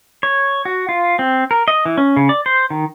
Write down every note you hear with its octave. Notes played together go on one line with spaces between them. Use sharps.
C#5
F#4
F4
C4
A#4
D#5
E3
C#4
C#3
D5
C5
D#3